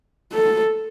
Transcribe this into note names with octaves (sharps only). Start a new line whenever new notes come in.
A4